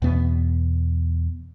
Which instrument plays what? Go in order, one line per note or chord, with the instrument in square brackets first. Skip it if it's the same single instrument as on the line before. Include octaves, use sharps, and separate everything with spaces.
[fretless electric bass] E2 B2 B3